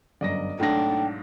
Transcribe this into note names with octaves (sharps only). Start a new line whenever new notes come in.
G1 F#2 D5 D#5 A#6
B1 G#2 A3 D4 G5 A#6